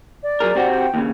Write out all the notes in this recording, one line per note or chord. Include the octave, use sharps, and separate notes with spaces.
D5
F#3 G#4 A#4
C3 C4 F#4
G5
D#2 C#3